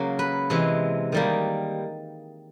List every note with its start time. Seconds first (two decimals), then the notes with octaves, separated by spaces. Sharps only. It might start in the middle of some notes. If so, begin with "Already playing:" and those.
Already playing: C#3 F#3 A#3
0.19 B4
0.50 C3 E3 G#3
1.12 D#3 G3 A#3